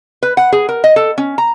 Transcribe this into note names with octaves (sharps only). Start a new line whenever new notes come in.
B4
F#5
G#4
A#4
D#5
A4
C#4
A#5